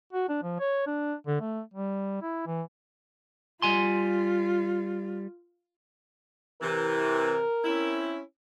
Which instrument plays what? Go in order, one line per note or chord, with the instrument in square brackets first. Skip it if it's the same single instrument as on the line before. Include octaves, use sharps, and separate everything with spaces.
[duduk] F#4
D4
F3
C#5
D4
D3
A3
G3
E4
E3
[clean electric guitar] G3 G#5 C6 [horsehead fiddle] F4
[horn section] C3 E3 [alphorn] A#4
[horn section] C4 C#4 E4